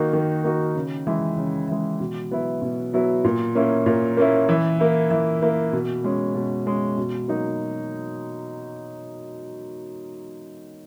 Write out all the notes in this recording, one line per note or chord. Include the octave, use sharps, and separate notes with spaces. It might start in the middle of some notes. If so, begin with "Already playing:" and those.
Already playing: D#3 A#3 D#4 F#4
D#3
A#3 D#4 F#4
C#3
E3 G#3
C#3
E3 G#3
B2
F#3 B3 E4
B2
F#3 B3 E4
A#2
A#3 C#4 E4
A#2
A#3 C#4 E4
E3
A#3 E4
E3
A#3 E4
B2
G#3 C#4
B2
G#3 C#4
B2
F#3 A#3 D#4